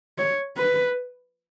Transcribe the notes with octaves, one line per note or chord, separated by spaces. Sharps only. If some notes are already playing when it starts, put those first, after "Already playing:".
C#5
B4